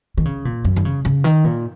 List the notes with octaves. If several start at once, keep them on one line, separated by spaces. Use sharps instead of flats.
D#3
C#3
A#2
F#2
D#3
C#3
C#3
D#3
A#2